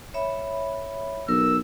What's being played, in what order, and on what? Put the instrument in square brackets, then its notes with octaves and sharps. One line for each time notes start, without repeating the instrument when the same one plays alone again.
[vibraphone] C#5 E5 B5
[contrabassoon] B1 [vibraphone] A#4 [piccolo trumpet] E6